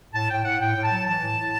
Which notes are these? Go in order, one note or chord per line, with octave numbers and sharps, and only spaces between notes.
A2 A5
A2 G5
A2 F#5
A2 G5
A2
A5
F#3
E3 A5
A2
A2